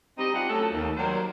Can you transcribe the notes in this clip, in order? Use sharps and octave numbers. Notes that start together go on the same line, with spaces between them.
G3 C4 D#4 G4 D#5
G3 C4 D4 F4 G4 F#5
F#3 A3 C#4 A4
D#2
D#3 F#3 G3 A#4 C5 D5